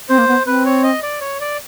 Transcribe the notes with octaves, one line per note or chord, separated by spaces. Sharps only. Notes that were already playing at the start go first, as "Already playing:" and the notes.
C4 C5
A#3
B3
C4 B4
C#5
D#5
D5
C#5
D5